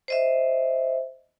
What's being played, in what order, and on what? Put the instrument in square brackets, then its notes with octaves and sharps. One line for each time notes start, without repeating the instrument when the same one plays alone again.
[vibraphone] C5 D#5 E5